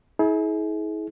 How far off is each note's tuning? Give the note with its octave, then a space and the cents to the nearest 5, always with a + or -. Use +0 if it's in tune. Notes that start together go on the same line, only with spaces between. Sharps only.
E4 -40 G#4 +35